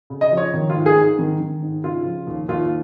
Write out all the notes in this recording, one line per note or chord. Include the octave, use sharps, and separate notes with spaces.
C#3
D#5
F3
C#5
D#3
F4
G#2
G#4
G#2
D#3
D#3
G#2
C#3 F4
F3
D#2
D#2 F4